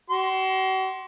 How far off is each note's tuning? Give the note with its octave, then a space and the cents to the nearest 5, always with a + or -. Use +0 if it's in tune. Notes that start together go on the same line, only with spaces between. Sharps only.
F#4 +40 C6 +5